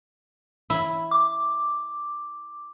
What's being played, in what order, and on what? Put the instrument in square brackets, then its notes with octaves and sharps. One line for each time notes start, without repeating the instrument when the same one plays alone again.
[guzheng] E4
[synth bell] D6